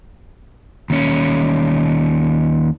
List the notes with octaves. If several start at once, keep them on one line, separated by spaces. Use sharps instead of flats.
D#2 C#4